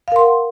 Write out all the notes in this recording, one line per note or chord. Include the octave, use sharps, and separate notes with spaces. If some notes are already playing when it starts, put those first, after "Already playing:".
A#4 F5 F#5 C6